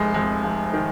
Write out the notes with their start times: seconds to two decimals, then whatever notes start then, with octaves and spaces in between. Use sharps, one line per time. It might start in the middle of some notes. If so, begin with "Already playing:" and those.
Already playing: F1 G#3
0.14 F2 G#3
0.44 F1
0.73 D#3